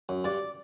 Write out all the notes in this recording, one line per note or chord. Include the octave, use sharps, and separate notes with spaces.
F#2
G2 D5